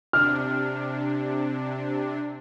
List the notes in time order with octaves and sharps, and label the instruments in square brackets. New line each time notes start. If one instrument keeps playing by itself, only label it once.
[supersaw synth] C3 D4 [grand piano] F6